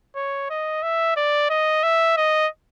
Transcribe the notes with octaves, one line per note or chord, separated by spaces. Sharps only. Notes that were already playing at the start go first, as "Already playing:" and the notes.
C#5
D#5
E5
D5
D#5
E5
D#5